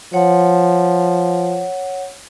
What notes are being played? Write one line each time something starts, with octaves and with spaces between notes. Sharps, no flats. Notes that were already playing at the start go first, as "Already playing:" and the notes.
F3 C#5 F#5